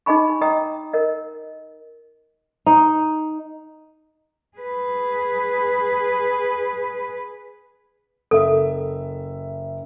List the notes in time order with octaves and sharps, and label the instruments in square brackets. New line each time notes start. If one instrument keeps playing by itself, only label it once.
[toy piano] D#4 G#4 D#5 G#5 B5 C#6
D#5 G5 A#5 D#6
A#4 D#5
[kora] D#4
[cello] G#4 B4
[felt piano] F#1 E5 [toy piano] A4